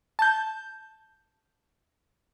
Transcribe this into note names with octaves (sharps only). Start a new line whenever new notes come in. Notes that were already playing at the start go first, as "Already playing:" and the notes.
A5 G6